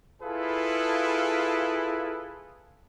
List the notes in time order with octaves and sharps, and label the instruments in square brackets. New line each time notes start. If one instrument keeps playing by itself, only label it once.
[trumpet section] E4 F4 G#4 A4 B4 F5